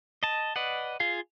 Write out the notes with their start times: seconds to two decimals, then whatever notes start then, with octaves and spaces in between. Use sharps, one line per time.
0.23 D#5 A5
0.56 B4 D5 D#5 F#5
1.00 F4 G#4 F5